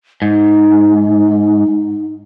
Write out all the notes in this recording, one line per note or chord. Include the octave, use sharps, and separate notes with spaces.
G#2 D#4